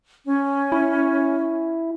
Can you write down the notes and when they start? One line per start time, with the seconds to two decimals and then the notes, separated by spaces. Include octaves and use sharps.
0.25 C#4
0.72 E4